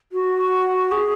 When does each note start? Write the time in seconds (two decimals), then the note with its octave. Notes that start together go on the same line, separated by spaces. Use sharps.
0.12 F#4
0.92 G#4